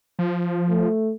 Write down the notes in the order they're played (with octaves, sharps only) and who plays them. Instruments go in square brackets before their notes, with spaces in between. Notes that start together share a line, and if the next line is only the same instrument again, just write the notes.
[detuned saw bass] F3
[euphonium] A3